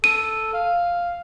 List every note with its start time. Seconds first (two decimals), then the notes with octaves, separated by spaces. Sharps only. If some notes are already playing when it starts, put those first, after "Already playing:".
0.04 A4 D#7
0.54 F5